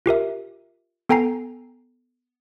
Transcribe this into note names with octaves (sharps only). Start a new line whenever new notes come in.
F4 G4 A#4 E5
B3 A4 G5 G#5 A#5 C7